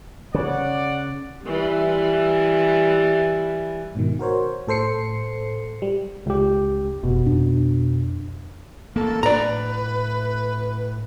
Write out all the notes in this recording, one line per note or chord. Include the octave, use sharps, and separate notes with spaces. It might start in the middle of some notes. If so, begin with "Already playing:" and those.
C#3 D5 F#5
E3 G3
G#2 B2 D#3
F#4 A#4 C5 C#5
A2 A4 C5 C7 C#7
G3
C#2 G4
F1 B2
F2 D4
A1 A#3 A4
A2 D4 B4 D5 A#5